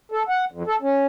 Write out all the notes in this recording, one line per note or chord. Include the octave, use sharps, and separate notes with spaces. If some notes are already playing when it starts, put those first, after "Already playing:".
A4
F#5
F2
A4
C#4